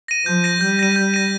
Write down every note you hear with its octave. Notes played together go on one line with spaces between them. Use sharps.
A#6 D#7
F3 G6
A#6 D#7
G3 G6
A#6 D#7
G6
A#6 D#7